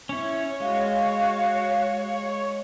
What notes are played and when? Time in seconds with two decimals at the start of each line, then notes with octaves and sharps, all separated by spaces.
0.09 C#4 E4 C#5
0.60 G#3 F#4 F5